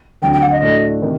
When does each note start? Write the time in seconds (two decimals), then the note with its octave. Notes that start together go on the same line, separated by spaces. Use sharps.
0.22 D2 D3 F#3 C4 G5
0.33 G5
0.42 F#5
0.52 D#5
0.62 A2 A3 D4 F#4 A4
1.02 C3 D#3